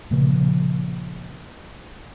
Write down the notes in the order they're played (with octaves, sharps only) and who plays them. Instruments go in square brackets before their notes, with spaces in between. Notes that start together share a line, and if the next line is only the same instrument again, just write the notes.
[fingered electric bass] A#2 C#3 F3 A#3